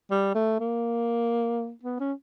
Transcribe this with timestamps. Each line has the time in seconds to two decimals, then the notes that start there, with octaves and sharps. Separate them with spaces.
0.11 G3
0.35 A3
0.60 A#3
1.84 B3
2.00 C#4